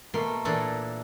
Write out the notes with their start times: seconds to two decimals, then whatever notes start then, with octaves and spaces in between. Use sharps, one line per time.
0.14 B2 A3 A#3 A#4 B5 C6
0.45 A#2 E3 D4 A4 A#5 C6